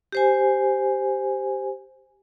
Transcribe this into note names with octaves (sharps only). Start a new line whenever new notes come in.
G4 C5 G#5